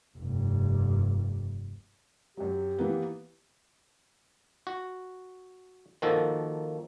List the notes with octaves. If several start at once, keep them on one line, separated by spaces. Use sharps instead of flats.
F1 G2
F#2 F#3 G4
E3 A#3 B3
F#4
D#3 F3 A#3 F#4 A4